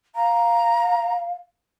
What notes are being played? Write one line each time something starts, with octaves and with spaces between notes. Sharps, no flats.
F5 A#5